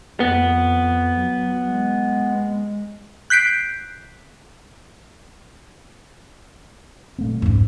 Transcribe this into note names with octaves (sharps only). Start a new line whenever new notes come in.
F2 B3
F#3
G#3
F#6 G6 B6 C7 D7
A#2 A3 C4
C2 F2 G#2 C#4